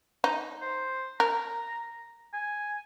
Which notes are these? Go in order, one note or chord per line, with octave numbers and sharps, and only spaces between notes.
D#4
C5
A#4 A#5
G#5